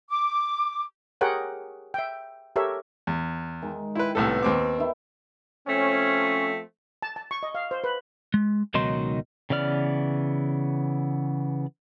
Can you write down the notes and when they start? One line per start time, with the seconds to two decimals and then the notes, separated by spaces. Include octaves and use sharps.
0.09 D6
1.21 G4 G#4 A#4 C#5 F#5 G5
1.94 E5 G5
2.56 G4 A4 A#4 C#5 E5
3.07 E2
3.62 D#3 G#3
3.95 E4 B4 G5 C6
4.15 C2 A2 B3 A4
4.43 D#2 C4 D6
4.78 D#3 E4
5.67 F3 A3 C4 C#4
7.02 A5
7.16 A5
7.31 C#6
7.43 D#5
7.55 F5
7.71 C5
7.84 B4
8.34 G#3
8.74 C#2 B2 D#3 F#3 D#4 C6
9.50 C#3 E3 B3 D5 F6